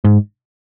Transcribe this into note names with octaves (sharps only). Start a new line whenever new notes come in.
G#2